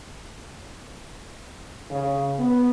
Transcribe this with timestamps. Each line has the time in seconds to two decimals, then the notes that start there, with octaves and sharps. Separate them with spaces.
1.91 C#3
2.38 B3